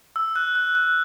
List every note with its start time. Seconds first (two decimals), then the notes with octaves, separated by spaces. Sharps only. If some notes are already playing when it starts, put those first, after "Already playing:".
0.16 E6
0.36 F#6
0.55 F#6
0.75 F#6